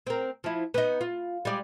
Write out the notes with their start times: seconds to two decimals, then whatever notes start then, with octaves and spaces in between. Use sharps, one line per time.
0.07 C4 A#4
0.44 F3 E4
0.74 B3 D#4
1.01 F4
1.45 G3 G#3 D5